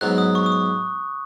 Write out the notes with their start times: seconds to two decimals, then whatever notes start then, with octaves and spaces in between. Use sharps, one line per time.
0.01 G#2 F#3 B3 F#6
0.18 D#6
0.35 C#6
0.46 D#6
0.52 C#6